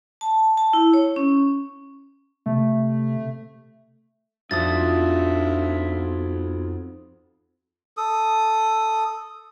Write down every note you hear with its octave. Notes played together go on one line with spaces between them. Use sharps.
A5
A5
E4
C#5
C#4
C3 A3
F2 D4 D#4 F#4 E5 D#6 A6
A4 D#6